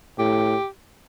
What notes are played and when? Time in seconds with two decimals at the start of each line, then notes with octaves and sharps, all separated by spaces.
0.19 A2 G4